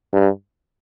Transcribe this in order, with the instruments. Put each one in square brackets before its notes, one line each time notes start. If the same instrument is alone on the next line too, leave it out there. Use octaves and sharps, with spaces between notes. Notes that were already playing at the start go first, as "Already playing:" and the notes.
[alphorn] G2